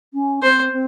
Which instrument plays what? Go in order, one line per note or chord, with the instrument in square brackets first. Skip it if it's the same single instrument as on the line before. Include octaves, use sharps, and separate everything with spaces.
[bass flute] C#4
[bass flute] C4 [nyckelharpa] C5
[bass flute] C4